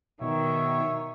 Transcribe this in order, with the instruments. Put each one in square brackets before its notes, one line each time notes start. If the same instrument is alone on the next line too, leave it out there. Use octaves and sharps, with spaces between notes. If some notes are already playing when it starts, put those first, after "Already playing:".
[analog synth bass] B2 [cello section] D#3 [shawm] C#5 [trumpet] E5